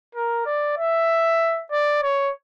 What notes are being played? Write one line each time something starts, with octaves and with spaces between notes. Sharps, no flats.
A#4
D5
E5
D5
C#5